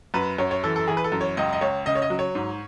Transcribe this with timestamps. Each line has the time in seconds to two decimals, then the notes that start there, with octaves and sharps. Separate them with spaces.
0.14 F#2 B4
0.38 F#2 C#5
0.51 C#5
0.63 E3 A4
0.76 A4
0.88 E3 G#4
0.97 B4
1.04 A4
1.12 F#2
1.21 C#5
1.37 C#2 D#5
1.53 D#5
1.61 C#2 C#5
1.86 C#3 D#5
1.95 C#5
2.02 D#5
2.10 F#3
2.19 C#5
2.35 G#2